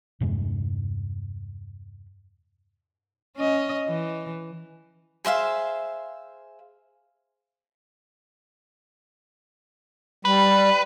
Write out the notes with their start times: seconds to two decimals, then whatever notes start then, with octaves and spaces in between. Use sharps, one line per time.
0.20 E2 G2 C3 G#3
3.37 C#4 D#5
3.89 E3
5.25 G#4 C5 E5 F5
10.25 G3 B4